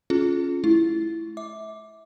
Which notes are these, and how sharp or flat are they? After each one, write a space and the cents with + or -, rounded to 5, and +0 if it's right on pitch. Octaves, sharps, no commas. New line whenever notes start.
C#4 +0 F4 +0 G#4 +35
A3 -40 E4 +0
E5 -25 D6 +0